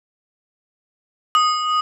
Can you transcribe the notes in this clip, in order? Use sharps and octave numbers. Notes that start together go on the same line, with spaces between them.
D#6